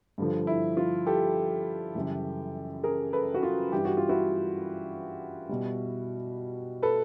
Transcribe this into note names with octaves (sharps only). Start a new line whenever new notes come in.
G2 D3 F3
E4
F4
G4 A4
F#2 C#3 E3 G3
G#4 A#4
A4 B4
F#4
F4
G2 E3 G3 G4
F#4
F4
E4 F#4
B2 G3
A4 B4